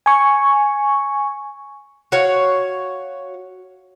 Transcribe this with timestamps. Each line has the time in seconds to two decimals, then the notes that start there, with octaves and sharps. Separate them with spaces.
0.06 G#5 C#6
2.12 F#4 C#5 F5